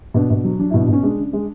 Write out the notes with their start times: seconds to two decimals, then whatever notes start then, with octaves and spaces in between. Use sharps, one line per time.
0.14 B2 D4
0.30 B2
0.44 F#3
0.59 F#3 D4
0.70 B2 E4
0.81 D4
0.88 B2 C#4
1.03 G#3 D4
1.19 C#3
1.33 G#3